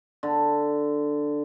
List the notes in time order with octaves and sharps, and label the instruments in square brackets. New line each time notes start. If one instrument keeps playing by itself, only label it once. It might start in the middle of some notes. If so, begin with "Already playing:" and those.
[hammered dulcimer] D3